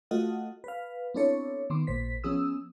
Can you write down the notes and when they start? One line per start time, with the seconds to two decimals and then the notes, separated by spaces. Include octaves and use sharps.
0.11 A3 F4 F#4 A4 D#5 F#5
0.64 B4 F5
1.14 B3 C4 D4 E4 A4 C#5
1.70 D#3 B3 C6 D6
1.87 A#1 A#2 C5 B6
2.24 F3 B3 C#4 G#4 D#6 E6